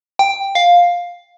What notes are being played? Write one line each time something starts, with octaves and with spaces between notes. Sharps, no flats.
G5
F5